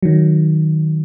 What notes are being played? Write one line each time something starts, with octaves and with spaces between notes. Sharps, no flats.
D#3 F#3